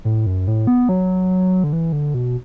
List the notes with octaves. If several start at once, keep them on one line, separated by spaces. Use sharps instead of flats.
A2
F#2
A2
B3
F#3
D3
E3
D3
B2